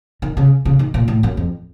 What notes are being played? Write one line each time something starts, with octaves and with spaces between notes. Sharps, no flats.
D#3
C#3
C#3
D#3
A#2
A2
F#2
F2